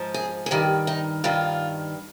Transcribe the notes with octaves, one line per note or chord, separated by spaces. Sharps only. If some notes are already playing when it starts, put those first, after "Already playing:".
Already playing: G#2 F3
G#4
G#4
G2 D#3 G4
D#4
G2 D#3 F4